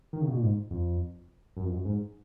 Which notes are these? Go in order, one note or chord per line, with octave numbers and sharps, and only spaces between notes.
D#3
C#3
B2
A#2
G#2
F2
F#2
F2
F#2
G#2